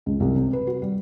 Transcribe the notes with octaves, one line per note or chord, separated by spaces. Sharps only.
C#2
C2
C3
B4
F#4
G3